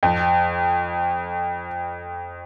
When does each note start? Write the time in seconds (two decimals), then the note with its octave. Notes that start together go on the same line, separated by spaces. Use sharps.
0.03 F2